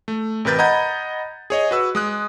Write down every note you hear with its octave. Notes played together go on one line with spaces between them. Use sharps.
A3
A1 C3 A#4 B4 G6 A6
D#5 F#5 A#5 B5 G6 G#6
G#4 C#5 D#5
F#4 B4 E6
G#3 D#6 F#6